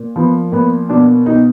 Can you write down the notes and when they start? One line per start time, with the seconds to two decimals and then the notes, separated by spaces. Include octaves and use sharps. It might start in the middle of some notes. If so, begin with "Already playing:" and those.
Already playing: A#2
0.16 F3 B3
0.52 A#2 B3
0.89 B2 D4
1.26 B2 D#4